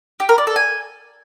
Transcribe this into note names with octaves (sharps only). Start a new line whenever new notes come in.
G4
A#4
D5
A4
G#5